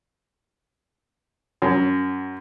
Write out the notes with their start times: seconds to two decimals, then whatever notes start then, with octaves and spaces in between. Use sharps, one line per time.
1.62 F#2